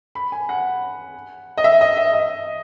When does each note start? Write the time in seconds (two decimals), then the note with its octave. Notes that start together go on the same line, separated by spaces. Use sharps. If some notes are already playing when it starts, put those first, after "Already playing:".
0.15 B5
0.32 G#5
0.49 F#5
1.58 D#5
1.64 E5
1.81 D#5
1.97 E5
2.13 D#5